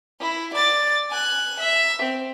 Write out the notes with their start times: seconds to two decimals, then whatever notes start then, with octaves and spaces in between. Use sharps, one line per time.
0.21 E4
0.54 D5 A6
1.11 G#5 F#6
1.60 E5
2.02 C4